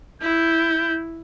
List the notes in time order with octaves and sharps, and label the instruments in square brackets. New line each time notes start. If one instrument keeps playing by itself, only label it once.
[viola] E4 [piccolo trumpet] G6